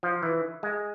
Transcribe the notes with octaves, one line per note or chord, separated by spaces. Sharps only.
F3
E3
G#3